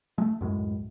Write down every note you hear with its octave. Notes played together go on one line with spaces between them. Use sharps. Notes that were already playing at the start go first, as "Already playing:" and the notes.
G#3 A3
C#2 F#2 A2 G#3